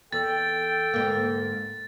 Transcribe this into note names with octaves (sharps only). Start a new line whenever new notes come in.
E2 A4 G5 A6
D2 G#2 A#3